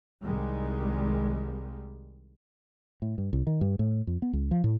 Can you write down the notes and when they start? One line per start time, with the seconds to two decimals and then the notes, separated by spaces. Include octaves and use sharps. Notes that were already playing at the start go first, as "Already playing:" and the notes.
0.22 C2 D#3 G3 G#3
3.02 A2
3.18 G2
3.33 C2
3.47 D#3
3.61 G2
3.79 A2
4.07 F2
4.22 B3
4.33 C#2
4.51 F3
4.64 A2